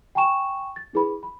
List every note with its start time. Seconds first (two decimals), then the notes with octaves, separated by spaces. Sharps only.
0.15 G5 G#5 A#5 C#6 E7
0.76 A6
0.93 D4 E4 G#4 B4 B5
1.23 B5